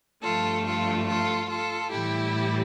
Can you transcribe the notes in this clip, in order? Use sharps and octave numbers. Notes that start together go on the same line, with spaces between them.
G2 F3 A3 F4 A4
F4 A4
F4 A4
F4 A4
A2 E3 G3 E4 G4